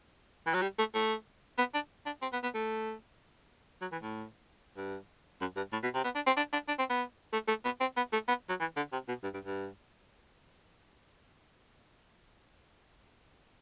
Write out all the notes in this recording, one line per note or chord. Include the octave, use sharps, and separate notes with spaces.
E3
F#3
G3
A3
A3
B3
D4
D4
C4
B3
B3
A3
F#3
E3
A2
G2
F#2
G2
A2
B2
C3
B3
D4
C4
D4
D4
D4
C4
B3
A3
A3
B3
C4
B3
A3
B3
F#3
E3
D3
C3
B2
G2
G2
G2